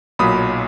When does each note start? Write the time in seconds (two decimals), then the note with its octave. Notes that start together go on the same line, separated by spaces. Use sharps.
0.19 B1 A#2 F#3 B5 D#6